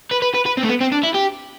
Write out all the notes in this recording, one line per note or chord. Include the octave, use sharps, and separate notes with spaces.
B4
B4
B4
B4
C4
A3
B3
C4
D4
E4
G4